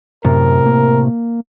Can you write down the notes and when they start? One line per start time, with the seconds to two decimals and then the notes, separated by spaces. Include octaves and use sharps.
0.25 F#2 A2 C3 A#4
0.66 A#3